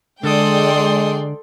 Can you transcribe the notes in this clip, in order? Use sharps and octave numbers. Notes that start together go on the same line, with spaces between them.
D3 G#3 A4 D5 G5 C6 D#6